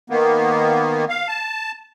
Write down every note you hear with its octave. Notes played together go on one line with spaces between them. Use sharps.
D#3 A#3 B3
F5
A5